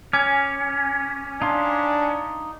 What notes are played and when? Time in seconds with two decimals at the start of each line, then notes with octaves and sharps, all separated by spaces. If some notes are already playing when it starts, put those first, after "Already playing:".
0.13 C#4 G#5 D6 F6 G#6
1.42 D4 D#4 F5 C6